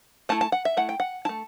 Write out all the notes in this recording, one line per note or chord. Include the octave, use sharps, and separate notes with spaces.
A3 E4 A5
A5
F#5
E5
A3 E4 F#5
G5
F#5
A3 E4 A5